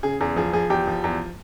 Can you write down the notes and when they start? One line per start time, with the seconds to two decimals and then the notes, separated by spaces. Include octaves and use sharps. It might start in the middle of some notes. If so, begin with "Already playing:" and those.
0.03 C#3 G#4
0.21 E2 G#4
0.36 F3 G#4
0.53 F3 G#4
0.70 E2 G4
0.87 F3
1.04 E2